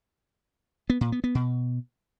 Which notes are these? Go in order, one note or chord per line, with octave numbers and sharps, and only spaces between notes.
B3
A#2
B3
B3
B2